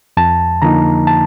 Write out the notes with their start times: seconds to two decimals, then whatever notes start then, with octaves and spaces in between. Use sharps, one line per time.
0.17 F2 A5
0.62 D3 F3 A#3 D#4 A#5
1.07 A5